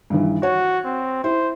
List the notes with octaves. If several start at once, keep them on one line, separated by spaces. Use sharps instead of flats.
G2 D#3 E3
F#4 C#5
C4
E4 C5